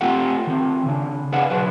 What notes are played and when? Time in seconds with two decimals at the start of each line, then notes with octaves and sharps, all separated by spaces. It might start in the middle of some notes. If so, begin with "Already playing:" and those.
0.01 A3 C4 F4 G4 A4 F#5
0.47 D#3 C4
0.86 C#3 D4
1.32 D4 G#4 B4 F5 F#5
1.50 B2 D3 F#3 F#4 B4